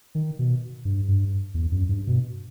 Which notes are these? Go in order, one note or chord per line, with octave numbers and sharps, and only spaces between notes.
D#3
B2
G2
G2
E2
F#2
G2
B2